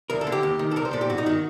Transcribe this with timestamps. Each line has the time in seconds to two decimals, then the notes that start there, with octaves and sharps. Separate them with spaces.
0.10 D2 A#4
0.21 A4
0.27 D3
0.32 G4
0.43 D#2
0.59 D#3
0.71 A4
0.76 C2 A#4
0.85 C5
0.93 A#2 A4
1.01 G4
1.10 G2 F#4
1.18 D#4
1.26 D#3 F#4